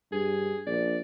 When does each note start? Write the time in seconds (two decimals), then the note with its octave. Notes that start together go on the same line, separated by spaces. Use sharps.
0.12 G2 G#4
0.67 A#1 D5